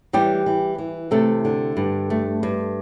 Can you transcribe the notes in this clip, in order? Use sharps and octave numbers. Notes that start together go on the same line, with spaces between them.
E3 G3 G4
E3
E3
C3 A3 A4
D3
G2
A3
G2